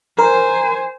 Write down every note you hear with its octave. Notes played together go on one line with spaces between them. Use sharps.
A#4 C5 G#5